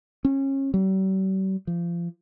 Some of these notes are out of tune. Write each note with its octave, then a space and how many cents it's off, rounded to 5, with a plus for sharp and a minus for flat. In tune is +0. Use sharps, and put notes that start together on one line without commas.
C#4 -30
G3 -45
F3 -30